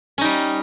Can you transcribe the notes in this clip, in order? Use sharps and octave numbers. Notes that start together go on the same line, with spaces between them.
G3 C#4 D#4